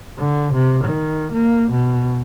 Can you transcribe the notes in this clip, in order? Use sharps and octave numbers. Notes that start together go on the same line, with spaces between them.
D3
C3
D#3
A#3
B2